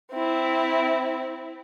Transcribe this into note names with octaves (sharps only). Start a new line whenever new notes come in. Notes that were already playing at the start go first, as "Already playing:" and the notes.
C4 E4